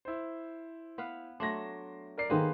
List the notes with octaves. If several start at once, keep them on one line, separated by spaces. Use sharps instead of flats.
E4 C5
B3 B4 F5
F#3 A3 D4 C6 A#6
A#4 D5 C7
D#3 A#3 B3 G#4 A4 B4 C5